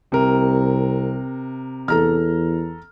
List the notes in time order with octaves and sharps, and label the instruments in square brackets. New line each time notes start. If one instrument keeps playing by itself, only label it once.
[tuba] C2 [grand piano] C3 A#4
[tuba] E2 [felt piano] A4 A#5 F6